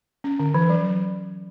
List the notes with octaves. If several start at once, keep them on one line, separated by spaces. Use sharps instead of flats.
C#4
D3
E3
F#3